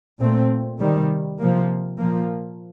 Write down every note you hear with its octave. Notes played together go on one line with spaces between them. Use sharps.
A#2 A3 C4
C3 D#3 G3
C3 F3 A#3
A#2 F3 A#3